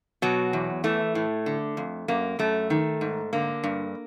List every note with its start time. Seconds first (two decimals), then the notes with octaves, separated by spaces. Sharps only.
0.22 B2 F#3
0.53 E2
0.84 E3 A3
1.15 A2
1.46 D3
1.77 F2
2.08 F#2 A#3
2.39 F#2 A3
2.70 D#3
3.01 G#2
3.33 D3 A#3
3.64 G2